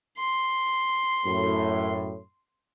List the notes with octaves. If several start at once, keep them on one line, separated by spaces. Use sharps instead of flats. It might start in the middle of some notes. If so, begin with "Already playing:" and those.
C6
F#2 A2